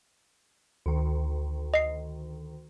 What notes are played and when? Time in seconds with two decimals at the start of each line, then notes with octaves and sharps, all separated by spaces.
0.86 D2 D#3
1.74 D#5 C7